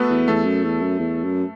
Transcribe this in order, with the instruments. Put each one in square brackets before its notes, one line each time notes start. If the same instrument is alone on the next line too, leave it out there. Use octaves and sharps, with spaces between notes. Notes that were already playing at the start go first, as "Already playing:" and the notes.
Already playing: [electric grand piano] A3 B3 F#4 A4 B4
[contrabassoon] E2
[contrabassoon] E2 [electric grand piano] A3 A4
[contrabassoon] F#2
E2
F#2
E2
F#2